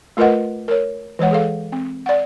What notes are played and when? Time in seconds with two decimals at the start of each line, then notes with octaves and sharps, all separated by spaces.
0.17 A3 F4 A#4 B4 D#5 F#5
0.68 A#4 C#5
1.19 E3 G#3 C#5 F#5
1.31 G#4 A4 F5
1.72 C4
2.06 D5 F#5